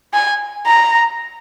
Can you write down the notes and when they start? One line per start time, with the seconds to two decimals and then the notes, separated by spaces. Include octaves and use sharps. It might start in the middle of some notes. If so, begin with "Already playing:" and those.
0.14 G#5
0.67 A#5